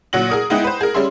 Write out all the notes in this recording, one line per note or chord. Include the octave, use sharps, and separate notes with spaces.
A#2 F#3 F#5 A#6 F#7
G#4 A#4 D#6
G#3 B3 D#4 E4 F#5 G5
B4 C5
G#4 A#4
G3 C#4 G#4 E5 C6